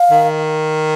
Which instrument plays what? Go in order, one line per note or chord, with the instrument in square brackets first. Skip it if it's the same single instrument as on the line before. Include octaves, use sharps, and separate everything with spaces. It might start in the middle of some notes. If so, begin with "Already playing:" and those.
Already playing: [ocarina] F5
[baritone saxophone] D#3